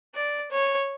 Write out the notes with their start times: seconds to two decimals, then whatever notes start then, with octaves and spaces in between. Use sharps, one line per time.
0.15 D5
0.51 C#5